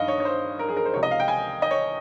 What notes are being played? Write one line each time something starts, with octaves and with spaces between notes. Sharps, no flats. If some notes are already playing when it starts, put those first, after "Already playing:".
Already playing: G2 D#3 D#5 F5
C#5
C#5
C5
A#4
G#4
A#4
C5
C#2 C3 F3 C#5
D#5
F5
G5
G#5
D#5
C#5